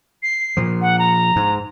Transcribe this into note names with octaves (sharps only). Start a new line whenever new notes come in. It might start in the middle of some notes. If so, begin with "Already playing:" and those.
C7
A#2 F3
F#5
A#5
G#2